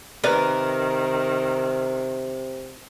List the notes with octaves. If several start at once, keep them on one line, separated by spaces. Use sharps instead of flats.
C3 D#3 A#4 B4 D5